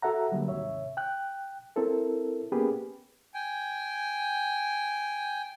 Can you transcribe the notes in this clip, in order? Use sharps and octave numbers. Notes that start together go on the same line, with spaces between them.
F#4 A4 E5 F#5 A#5
D3 F#3 G3 A#3
D#2 G#2 C3 C#5 E5
G5 F#6
C4 E4 A4 A#4
A#3 B3 C#4 G4 G#4 B4
G5 G#5